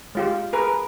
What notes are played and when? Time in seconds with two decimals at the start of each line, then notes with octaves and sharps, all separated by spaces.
0.15 G#3 F4 G4
0.53 G#4 A#4 B4